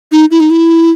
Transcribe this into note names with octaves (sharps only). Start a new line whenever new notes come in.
D#4
E4
D#4
E4